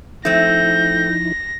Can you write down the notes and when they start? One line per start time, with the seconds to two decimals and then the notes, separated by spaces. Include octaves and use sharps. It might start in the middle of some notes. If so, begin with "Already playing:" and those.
0.25 F3 A3 C4 D#4 E4 G6 A#6